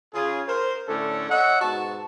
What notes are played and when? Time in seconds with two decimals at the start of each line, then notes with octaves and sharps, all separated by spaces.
0.14 C#3 F4 G#4
0.47 A#4 C5
0.88 A2 D3 A3 C#4 D4 A4
1.30 C#5 D#5 E5 F#5
1.61 G#2 B2 F#4 A5